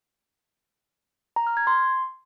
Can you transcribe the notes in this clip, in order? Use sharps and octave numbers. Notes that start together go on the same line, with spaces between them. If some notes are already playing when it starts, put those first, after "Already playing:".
A#5
F6
G#6
C6